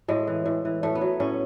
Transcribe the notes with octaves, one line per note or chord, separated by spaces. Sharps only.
A2 G#3
E3
A2
E3
A2 A3
B3
F#3
A2 C#4